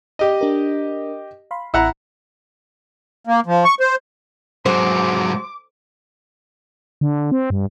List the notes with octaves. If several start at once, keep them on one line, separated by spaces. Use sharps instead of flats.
G4 D#5
D4 A#4
F5 B5 C6
A1 E4 F#5 A#5
A#3
F3
C#6
C5
G#2 F#3 C5 D6
D3
C4
G2